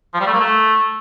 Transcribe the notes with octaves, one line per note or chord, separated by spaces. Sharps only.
F3
G3
A3
A#3
A3